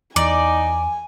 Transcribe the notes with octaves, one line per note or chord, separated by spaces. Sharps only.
E2 D#4 D5 G#5